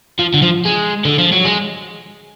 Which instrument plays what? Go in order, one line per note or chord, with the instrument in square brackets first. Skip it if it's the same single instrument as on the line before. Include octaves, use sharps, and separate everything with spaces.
[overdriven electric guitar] F3
D3
F3
G#3
D3
F3
F#3
G#3